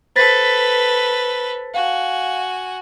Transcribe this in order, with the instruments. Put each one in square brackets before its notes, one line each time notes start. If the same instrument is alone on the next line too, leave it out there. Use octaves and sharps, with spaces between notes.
[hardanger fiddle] A4 B4 [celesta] C5 A6 B6
[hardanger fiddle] F#4 G#5 [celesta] F5